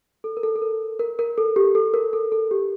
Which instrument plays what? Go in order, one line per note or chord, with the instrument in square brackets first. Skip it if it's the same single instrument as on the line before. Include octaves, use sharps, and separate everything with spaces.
[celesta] A4
A#4
A4
A4
A#4
A#4
A#4
A4
G4
A4
A#4
A4
A4
G4